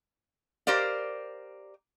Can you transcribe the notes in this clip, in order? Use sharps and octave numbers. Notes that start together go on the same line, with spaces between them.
G4 A#4 C5 D5 F5